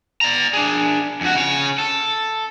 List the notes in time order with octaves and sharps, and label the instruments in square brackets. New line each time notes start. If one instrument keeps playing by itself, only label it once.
[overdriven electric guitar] D5 A#5
D4 G#4
F2 F#4
C#3 C#5
A4